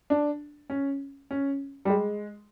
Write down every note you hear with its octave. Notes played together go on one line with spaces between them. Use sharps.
D4
C#4
C#4
G3
G#3